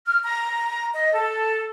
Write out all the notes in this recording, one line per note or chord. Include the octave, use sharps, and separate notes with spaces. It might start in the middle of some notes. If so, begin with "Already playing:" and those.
F6
A#5
D#5
A4